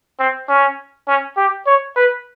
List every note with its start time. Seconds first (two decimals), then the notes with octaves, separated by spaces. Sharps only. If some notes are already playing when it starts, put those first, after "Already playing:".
0.19 C4
0.48 C#4
1.07 C#4
1.37 G4
1.67 C#5
1.96 B4